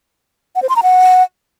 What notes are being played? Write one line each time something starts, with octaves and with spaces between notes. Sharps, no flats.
F#5
C5
C6
A#5
F#5